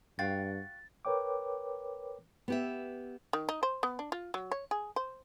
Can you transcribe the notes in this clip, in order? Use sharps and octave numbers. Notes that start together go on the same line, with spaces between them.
G2 F#4 F5 G5 A6
A#4 B4 C#5 G5 D6
B3 G4 E5
D#3
D#4
C5
B3
D4
F4
F#3
C#5
G#4
C5